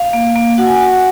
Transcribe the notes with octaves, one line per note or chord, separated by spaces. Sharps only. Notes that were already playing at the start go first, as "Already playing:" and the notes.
Already playing: F5
A#3
A#3
F#4 F#5
G#5
F#5
F#4